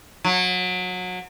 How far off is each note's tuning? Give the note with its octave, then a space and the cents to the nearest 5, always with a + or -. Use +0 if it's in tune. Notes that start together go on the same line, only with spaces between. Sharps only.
F#3 -25